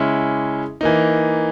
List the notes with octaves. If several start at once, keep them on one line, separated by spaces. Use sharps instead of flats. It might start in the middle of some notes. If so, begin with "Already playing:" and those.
Already playing: C#3 G#3 C#4 E4
E3 A#3 D#4